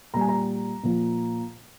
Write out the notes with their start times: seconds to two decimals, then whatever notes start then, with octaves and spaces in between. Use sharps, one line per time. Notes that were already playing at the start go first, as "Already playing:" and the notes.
0.14 A#2 A#5
0.16 G3 G#5
0.29 A#5
0.83 A#2 F3